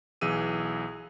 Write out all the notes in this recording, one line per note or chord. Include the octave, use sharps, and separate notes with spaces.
B1 E3 G#4 E6 D#7